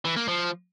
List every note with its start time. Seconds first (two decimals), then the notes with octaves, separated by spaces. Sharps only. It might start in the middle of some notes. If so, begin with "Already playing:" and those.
0.05 E3
0.16 A#3
0.28 F3